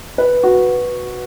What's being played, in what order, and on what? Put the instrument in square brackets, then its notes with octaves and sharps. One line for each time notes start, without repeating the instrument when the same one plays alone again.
[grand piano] B4
F#4